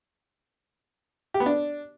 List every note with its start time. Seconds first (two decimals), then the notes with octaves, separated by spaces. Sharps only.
1.34 G4
1.40 B3
1.46 D4